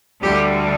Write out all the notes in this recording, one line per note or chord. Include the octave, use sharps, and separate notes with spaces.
D2 D3 G3 G4